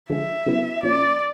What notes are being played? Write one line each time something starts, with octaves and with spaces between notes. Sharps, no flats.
D3 F3 G#3 E5
C#3 F#3 B3 E4
A#2 F3 A#3 C#4 D5